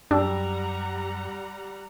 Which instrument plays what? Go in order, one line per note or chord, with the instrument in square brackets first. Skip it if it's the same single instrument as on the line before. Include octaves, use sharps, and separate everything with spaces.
[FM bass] F#2 [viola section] G3 F#5 A#5 [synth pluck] D4 [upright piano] G4 E6